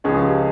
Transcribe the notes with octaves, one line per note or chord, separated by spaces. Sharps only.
C#2 C#3 F3 G#3 C#4 G#4
G4